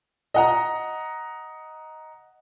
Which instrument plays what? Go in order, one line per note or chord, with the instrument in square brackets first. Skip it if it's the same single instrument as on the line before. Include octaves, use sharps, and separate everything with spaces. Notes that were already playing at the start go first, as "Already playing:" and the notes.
[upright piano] D#5 F#5 A#5